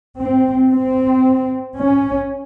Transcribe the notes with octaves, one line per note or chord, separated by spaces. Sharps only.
C4
C4
C#4